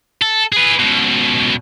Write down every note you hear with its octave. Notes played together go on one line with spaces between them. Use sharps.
A4
G#4 B4
C#2 B2